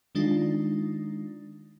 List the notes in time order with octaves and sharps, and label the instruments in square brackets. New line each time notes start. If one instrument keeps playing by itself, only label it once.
[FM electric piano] D#3 G#3 D4 D#4 F4